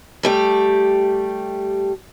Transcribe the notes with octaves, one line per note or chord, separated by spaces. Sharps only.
G3 A3 G4